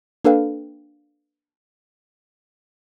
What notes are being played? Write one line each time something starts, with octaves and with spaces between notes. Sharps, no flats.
A#3 D4 A4 B4 F5 G5